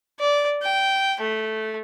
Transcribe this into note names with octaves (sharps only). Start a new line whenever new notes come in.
D5
G5
A3